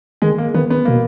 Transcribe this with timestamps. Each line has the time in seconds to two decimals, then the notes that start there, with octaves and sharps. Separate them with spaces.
0.22 D#3 G#3
0.38 A#3
0.54 D#3 B3
0.70 B3
0.85 B2 A#3